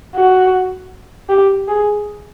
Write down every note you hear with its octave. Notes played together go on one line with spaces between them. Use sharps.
F#4
G4
G#4